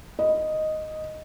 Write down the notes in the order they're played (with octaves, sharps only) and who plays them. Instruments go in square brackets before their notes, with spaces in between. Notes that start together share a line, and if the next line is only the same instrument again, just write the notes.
[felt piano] D#5